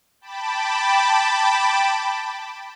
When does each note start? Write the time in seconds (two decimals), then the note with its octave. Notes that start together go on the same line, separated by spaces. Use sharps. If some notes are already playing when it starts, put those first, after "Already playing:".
0.21 G5 A5 B5 D6